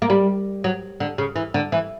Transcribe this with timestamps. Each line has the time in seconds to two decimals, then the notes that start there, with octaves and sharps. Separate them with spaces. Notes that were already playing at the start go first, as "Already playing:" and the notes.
0.02 A#3
0.10 G3
0.64 F#3
1.00 D3
1.18 C#3
1.36 E3
1.54 D3
1.72 E3